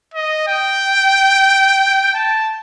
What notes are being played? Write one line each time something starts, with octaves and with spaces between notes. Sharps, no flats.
D#5
G5
A5